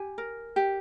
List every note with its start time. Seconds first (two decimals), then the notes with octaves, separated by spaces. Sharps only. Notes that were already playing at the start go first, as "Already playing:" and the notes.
Already playing: G4 G#5
0.18 A#4
0.56 G4